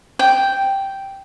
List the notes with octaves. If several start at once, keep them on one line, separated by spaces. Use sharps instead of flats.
G5